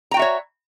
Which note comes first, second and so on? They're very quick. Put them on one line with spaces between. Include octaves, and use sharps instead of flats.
A#5 G5 F#4 E5 C#5